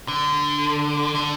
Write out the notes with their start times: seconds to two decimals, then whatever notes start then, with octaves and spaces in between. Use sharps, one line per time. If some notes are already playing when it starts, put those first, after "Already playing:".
0.08 D3
1.15 D3